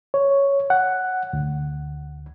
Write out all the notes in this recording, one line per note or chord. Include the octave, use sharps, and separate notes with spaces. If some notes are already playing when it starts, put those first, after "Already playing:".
C#5
F#5
D2